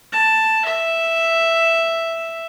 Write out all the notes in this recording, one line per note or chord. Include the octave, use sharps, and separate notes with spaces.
A5
E5